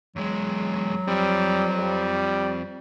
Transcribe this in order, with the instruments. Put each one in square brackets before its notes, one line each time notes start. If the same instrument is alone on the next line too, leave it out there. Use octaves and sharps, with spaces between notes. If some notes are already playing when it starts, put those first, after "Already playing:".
[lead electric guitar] E2 G#3 [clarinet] F#3
[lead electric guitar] F3 C4 [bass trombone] G3
[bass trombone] G3